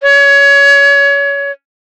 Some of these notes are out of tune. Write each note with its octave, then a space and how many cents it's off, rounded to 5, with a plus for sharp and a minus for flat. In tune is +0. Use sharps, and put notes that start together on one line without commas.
C#5 +25